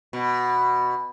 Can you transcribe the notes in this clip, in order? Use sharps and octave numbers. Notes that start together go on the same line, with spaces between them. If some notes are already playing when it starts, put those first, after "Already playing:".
B2